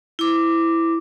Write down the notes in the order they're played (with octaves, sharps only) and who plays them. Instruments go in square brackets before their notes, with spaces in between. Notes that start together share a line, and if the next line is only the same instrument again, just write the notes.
[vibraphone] E4 D6